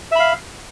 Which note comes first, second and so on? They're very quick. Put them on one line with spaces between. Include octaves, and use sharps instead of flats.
E5 B5 F5